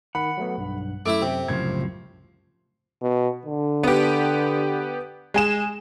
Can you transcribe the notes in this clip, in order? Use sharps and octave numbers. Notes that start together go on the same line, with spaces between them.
D#3 F#5 B5
F#3 A3 B3
B1 G2
F#2 A3 E4 E5 D6 D7
C3 G5
C2 F#2 A2 C#3 F3 G#6
B2
D3
B3 G4
G#3 G#5 E7